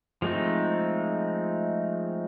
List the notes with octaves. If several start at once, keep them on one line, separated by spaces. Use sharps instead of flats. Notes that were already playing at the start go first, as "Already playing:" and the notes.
F3 G#3 A3 C4 D#4